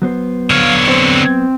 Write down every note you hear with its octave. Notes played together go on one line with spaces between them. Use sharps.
F#3 B3 C5
D3 C#5 F5
C4